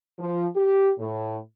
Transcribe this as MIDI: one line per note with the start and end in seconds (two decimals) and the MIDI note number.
0.19 0.47 53
0.56 0.91 67
0.99 1.37 45